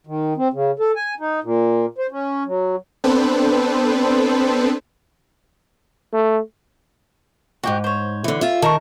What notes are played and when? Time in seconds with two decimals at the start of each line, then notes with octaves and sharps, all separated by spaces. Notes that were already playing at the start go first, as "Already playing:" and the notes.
0.07 D#3
0.37 C4
0.53 C#3
0.79 A4
0.96 G#5
1.20 D#4
1.43 A#2
1.98 C5
2.11 C#4
2.46 F#3
3.04 B3 C4 D4 A4 B4 C5
6.13 A3
7.63 E2 G#2 F#4 G4
7.84 C5 C#5
8.24 D3 E3
8.41 F4 E5
8.62 D#3 A#4 A5 A#5 C#6